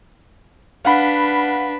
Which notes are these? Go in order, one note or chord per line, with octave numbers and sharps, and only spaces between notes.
D4 B4 F5 F#5 B5